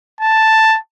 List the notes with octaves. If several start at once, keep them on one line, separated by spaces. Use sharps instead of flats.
A5